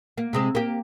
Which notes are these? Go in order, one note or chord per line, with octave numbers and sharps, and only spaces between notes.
A#3
C3 G#3 C4
A#3 G4